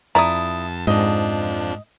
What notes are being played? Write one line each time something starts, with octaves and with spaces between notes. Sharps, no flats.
F2 E4 D5 A5 A#5 D#6
F2 G#2 F3 D4 D#5